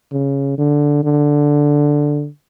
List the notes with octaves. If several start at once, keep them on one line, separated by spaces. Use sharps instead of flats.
C#3
D3
D3